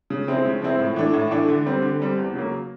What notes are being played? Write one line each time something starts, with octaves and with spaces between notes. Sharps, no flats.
C#3
F3 G#3 C4 E4
C#3
F3 G#3 C4 E4
A2
E3 A3 D4
A2
E3 A3 D4
D3
G3 C4
D3
G3 C4
E2
C#3 F#3 A#3